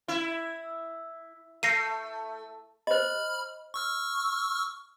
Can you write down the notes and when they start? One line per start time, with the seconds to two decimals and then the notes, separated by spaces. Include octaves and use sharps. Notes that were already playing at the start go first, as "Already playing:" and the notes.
0.08 E4
1.63 A3 A#6 C7 D#7
2.87 C5 D#5 B5 F6
3.74 C#6 E6 F6